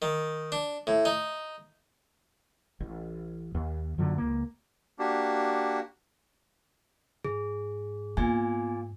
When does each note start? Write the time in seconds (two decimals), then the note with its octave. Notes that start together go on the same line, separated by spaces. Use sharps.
0.02 D#3
0.52 D4
0.87 A2
1.05 D#4
2.80 A1
3.55 D#2
3.98 F#2 A#2 D3 F#3
4.18 C#2 A#3
4.99 A#3 D4 F#4 G4
7.25 G#2 G#4
8.17 A#2 B3 G#5